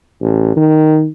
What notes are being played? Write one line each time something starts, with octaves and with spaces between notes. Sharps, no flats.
A1
D#3